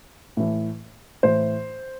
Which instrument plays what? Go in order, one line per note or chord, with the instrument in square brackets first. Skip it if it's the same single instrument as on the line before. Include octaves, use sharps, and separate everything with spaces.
[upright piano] A2 E3
A2 E3 C5